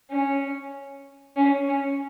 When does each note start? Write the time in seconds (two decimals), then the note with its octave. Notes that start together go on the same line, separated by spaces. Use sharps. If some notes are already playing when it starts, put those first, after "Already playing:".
0.10 C#4
1.36 C#4
1.67 C#4